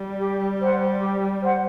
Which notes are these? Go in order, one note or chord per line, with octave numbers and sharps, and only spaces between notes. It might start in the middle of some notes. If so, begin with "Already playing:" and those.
Already playing: G3
G4
C5 F#5
G4
C5 F#5